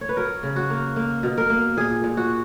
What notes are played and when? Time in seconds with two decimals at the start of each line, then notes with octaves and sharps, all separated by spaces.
0.01 C#5
0.09 B4
0.16 F#3 A#4
0.43 C#3
0.56 F#4
0.70 A#3
0.96 A#3
1.23 B2
1.38 A#4
1.50 A#3
1.77 A#2 G#4
2.04 A#2
2.17 F#4